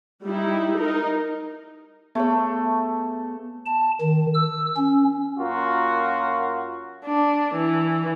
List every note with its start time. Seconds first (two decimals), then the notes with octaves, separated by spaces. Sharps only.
0.23 G3 D#4 E4
0.78 D#4 A#4
2.15 A3 B3 G#4 C#5
3.66 A5
4.01 D#3
4.34 E6
4.77 C#4
5.39 F#2 A#3 F4 F#4
7.05 D4
7.54 E3